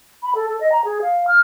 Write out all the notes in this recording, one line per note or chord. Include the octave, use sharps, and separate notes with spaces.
B5
A4
A4
D#5
A#5
G#4
F5
F6